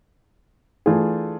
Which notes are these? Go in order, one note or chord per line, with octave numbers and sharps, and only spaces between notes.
E3 A3 D4 F4 G#4